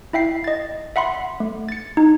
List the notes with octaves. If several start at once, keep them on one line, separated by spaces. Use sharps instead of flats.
E4 E5 G5 C7
D#5 A6
E5 F#5 B5 C6
A3
A6 C#7
D#4